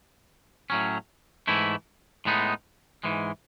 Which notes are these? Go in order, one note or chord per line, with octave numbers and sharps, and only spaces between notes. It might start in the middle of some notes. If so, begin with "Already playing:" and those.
A2 F#3 C#4
G#2 E3 A3 E4
A2 G#3 B3 D#4
G#2 E3 G#3